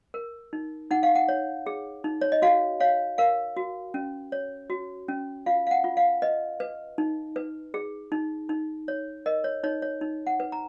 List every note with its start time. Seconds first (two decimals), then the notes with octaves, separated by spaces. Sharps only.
0.14 A#4
0.53 D#4
0.91 D#4 F#5
1.03 F5
1.15 F#5
1.28 C#5
1.66 G#4
2.04 D#4
2.21 C#5
2.32 D#5
2.42 F#4 F5
2.80 C#5 F5
3.18 A#4 F5
3.57 F#4
3.94 C#4
4.32 C#5
4.70 F#4
5.08 C#4
5.46 F4 F5
5.67 F5
5.71 F#5
5.84 F4
5.97 F5
6.22 B4 D#5
6.60 B4
6.98 D#4
7.36 B4
7.74 G#4
8.12 D#4
8.49 D#4
8.88 C#5
9.26 A#4 D#5
9.44 C#5
9.63 D#4 C#5
9.82 C#5
10.01 D#4
10.27 F#5
10.40 B4
10.52 A#5